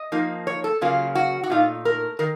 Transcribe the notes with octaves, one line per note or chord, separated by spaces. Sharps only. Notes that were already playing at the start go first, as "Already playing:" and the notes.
Already playing: D#5
F3 A#3 D#4
C#5
A4
C#3 F#3 A#3 C#4 F4
F#4
F#4
A#2 A3 D#4 F4
A#4
D#3 A#4